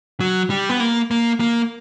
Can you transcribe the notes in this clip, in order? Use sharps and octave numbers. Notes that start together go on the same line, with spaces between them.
F#3
G3
B3
A#3
A#3
A#3